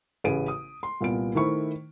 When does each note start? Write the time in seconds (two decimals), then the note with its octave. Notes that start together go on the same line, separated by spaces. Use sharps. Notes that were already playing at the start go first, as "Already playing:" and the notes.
0.24 A1 C#3 G#4 B4 D7 D#7
0.48 D#6
0.83 C6
1.01 C2 A#2 B3 D7
1.35 D#3 A3 E4 C5 C#6